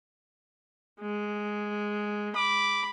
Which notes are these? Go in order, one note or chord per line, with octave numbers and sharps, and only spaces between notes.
G#3
B5 D6